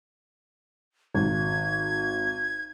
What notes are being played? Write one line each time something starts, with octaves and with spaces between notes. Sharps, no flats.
G#1 G#6